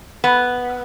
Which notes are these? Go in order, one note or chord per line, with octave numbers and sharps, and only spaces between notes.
B3